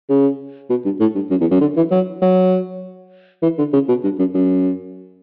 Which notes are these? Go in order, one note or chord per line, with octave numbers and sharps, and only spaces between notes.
C#3
B2
G2
A2
G2
F#2
E2
F#2
D3
E3
F#3
F#3
E3
D3
C#3
B2
G2
F#2
F#2